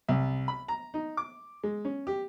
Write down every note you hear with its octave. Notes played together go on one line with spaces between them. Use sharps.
C2
B5
A#5
D#4
D6
G#3
C#4
G4